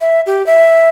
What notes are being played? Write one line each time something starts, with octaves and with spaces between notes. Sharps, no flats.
E5
G4
E5